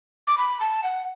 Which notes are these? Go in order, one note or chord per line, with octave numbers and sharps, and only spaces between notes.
D6
B5
A5
F#5